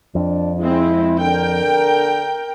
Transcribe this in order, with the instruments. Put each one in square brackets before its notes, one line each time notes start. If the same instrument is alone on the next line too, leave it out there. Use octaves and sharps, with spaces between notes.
[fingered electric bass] F2 [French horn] D4
[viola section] G#3 C4 [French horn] E4
[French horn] D3 [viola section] A#4 G5